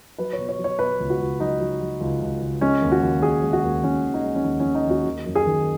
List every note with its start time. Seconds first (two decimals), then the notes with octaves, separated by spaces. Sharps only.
0.18 F#3 B4
0.33 C#5
0.38 B2
0.49 C#5
0.58 F#3
0.64 C#5
0.79 B2 B4
1.00 C#2
1.10 F#4
1.19 C#2
1.40 F#3 D#4
1.60 F#3
1.81 F#3
2.01 C#2
2.21 C#2
2.42 C#2
2.61 G#3 C#4
2.82 D#2
2.92 F#4
3.02 D#2
3.22 D#3 G#4
3.43 G#3
3.53 F#4
3.64 D#2
3.83 D#2 C#4
4.03 D#3
4.14 D#4
4.24 G#3
4.35 C#4
4.44 D#2 D#4
4.60 D#2 C#4
4.75 D#4
4.85 D#2 F#4
5.06 D#3
5.26 F#2
5.35 G#4
5.46 D#3